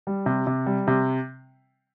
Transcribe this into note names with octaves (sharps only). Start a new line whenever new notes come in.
G3
C3
C3
G3
C3